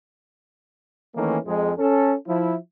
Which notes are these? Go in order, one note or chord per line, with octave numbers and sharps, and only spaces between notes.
D#3 E3 A3 A#3 C#4
F2 G#3
C#4 A4
F3 E4